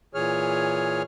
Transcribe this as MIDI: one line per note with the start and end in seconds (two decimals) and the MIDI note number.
0.14 1.03 46
0.14 1.03 52
0.14 1.03 68
0.14 1.03 73
0.14 1.03 89